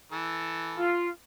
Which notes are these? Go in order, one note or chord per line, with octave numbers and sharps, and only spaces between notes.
E3 A4
F4